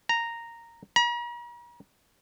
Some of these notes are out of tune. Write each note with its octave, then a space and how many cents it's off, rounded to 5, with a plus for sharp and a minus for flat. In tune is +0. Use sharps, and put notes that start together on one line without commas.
A#5 -5
A#5 +45